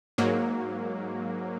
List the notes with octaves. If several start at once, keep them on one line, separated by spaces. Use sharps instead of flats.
G#2 F#3 A#3